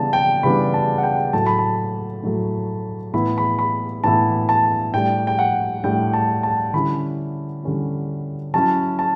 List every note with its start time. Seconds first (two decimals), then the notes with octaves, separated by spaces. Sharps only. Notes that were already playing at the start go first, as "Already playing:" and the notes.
Already playing: C#3 E3 G3 B3 D4 A5
0.13 G5
0.43 C#3 E3 G3 B3 D4 B5
0.74 A5
0.98 F#5
1.03 G5
1.33 A2 F#3 A3 A5
1.46 B5
1.59 A5
2.23 A2 F#3 A3
3.14 A2 E3 B3 E4 B5
3.38 B5
3.59 B5
4.04 A2 E3 B3 E4 A5
4.49 A5
4.93 A2 G3 D4 G5
5.27 G5
5.39 F#5
5.84 A2 G3 D4 G5
6.13 A5
6.43 A5
6.73 D3 G3 C#4 E4 B5
7.64 D3 G3 C#4 E4
8.54 F#3 C#4 E4 A5
8.99 A5